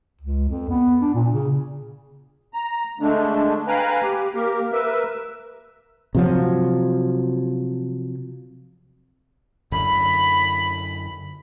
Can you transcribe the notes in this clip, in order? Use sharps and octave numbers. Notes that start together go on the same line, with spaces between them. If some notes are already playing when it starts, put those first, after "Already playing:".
C#2
F2
B3
D4
A#2
C#3
A#5
D3 G#3 A3 D4
B4 F5 G5 G#5 A#5 B5
G4
A#3 G4 A#4
A#4 B4 E5 E6
C3 F3 F#3
F#2 D3 B5